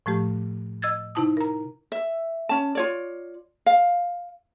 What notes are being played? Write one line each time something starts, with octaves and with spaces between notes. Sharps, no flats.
A2 F3 A3 G4
D#5 E6 G#6 A6
C3 D#4 E4 A5 D#6
A#4 A#5
E5
C#4 A5
F4 C#5 D5
F5